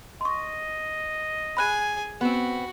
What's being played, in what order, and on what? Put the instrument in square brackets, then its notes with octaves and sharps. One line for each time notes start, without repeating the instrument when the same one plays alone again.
[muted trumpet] D#5 [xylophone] C6 C#6
[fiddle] G#4 G#5 [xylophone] B5 F#6 D#7
[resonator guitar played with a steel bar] B3 C4 [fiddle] F#4